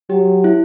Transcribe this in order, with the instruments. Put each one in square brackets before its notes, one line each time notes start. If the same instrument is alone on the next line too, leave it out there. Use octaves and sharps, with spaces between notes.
[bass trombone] F#3 [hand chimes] G4
[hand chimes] E4